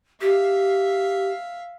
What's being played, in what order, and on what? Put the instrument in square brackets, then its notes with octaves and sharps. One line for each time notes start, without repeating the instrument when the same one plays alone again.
[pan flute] G4 [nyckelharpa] E5 F5